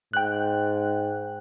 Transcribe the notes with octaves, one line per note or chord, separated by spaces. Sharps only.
G#2 G5 F#6